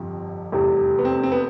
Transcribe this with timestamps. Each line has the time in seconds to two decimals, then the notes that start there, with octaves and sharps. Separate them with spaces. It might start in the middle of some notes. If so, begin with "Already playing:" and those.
Already playing: G1 F2 C3 F3
0.52 F1 E2 C3 G3
0.99 B3
1.05 C4
1.23 C4
1.32 B3